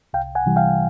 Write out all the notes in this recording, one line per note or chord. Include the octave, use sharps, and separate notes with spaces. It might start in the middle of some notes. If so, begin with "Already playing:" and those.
C2 F5 G5
F#5 G#5
C3 E3 G3
F5 G5